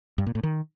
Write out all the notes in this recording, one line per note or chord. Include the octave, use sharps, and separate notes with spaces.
G2
A#2
A2
D#3